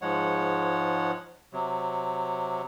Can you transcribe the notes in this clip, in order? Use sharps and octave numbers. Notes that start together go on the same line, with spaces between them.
G#2 F3 G#3 C#5 F#5
C3 F#3